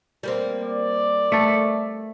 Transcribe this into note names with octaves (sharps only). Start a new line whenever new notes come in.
G3 A#3 C4
D5
A3 A4